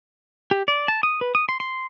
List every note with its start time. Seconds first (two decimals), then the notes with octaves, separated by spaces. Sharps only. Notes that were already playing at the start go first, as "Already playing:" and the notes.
0.51 G4
0.68 D5
0.88 A5
1.03 D#6
1.21 B4
1.35 D#6
1.49 C6
1.60 C6